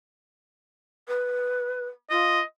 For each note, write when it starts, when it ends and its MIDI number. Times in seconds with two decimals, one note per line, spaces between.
1.08 1.87 71
2.10 2.37 65
2.10 2.42 75